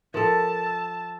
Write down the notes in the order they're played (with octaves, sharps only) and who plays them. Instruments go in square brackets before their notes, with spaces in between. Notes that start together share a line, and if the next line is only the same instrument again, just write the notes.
[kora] F3 A4 [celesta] A#4 [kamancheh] A5
[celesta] E6